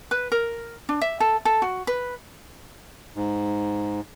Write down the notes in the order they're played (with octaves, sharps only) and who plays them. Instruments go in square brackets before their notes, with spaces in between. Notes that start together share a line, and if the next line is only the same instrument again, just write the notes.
[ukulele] B4
A#4
D4
E5
A4
A4
F#4
B4
[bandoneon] G#2